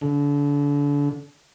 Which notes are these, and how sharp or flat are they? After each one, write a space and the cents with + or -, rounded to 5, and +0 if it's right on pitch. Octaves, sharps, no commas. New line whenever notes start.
D3 -35